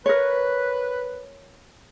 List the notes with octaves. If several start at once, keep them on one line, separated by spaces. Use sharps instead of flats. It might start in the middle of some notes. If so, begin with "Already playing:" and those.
A#4 B4 C#5